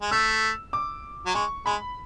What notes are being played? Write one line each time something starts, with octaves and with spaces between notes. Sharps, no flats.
G#3
A3 E6
D6
F#3
G#3 C#6
G#3 B5